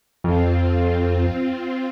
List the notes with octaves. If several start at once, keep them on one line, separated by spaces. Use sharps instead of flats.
F2 C4 F4